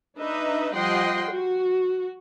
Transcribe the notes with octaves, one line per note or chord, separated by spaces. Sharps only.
D4 D#4 B4 D#5 E5
F3 G3 D#5 F#5 G5 C6
F#4